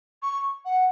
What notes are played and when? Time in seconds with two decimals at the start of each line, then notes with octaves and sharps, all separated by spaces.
0.22 C#6
0.65 F#5